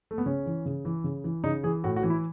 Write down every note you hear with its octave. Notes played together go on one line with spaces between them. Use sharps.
A3
B3
C#3 C#4
E3
C#3
E3
C#3
E3
C#3 D#4
E3 G#4
A2 F#4
F#4
E3
E4